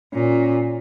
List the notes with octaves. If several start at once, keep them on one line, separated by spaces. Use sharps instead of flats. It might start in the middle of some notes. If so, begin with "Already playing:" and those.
A#2 C#4